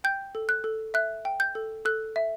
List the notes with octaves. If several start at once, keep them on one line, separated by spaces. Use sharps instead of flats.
G5 G6
A4
F#6
A4
E5 F#6
G5
G6
A4
A4 F#6
E5